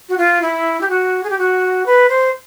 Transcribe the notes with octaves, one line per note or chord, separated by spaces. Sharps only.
F#4
F4
E4
G4
F#4
G#4
G4
F#4
B4
C5